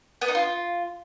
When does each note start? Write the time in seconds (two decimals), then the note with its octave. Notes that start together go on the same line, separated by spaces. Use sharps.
0.22 B3
0.28 D#4
0.35 F4